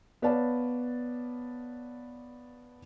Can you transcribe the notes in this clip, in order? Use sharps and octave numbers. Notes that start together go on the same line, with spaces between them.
B3 B4 C#5 D5 F5 A5